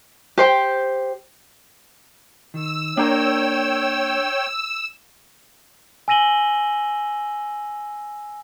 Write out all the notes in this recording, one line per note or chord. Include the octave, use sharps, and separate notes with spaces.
G4 C5 G5
D#3 E6
A#3 D4 A#4 C#5 G5 A#5
G#5 E6 A#6 D#7 F#7 G7